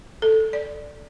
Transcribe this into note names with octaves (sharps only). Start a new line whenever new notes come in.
A4
D5